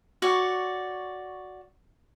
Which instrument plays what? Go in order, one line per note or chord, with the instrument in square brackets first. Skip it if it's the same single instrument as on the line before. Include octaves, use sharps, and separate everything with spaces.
[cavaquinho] F#4 C#5 D5